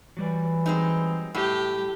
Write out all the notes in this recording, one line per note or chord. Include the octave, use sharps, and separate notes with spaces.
E3 F#3 G3 D5
G#3 C4 D#4
A2 G4